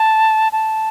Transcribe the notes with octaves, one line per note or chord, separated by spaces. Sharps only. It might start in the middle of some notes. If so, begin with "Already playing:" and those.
Already playing: A5
A5